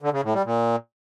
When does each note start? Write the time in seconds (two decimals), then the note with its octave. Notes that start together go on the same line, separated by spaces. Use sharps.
0.02 D3
0.13 C#3
0.24 A2
0.34 G3
0.45 A#2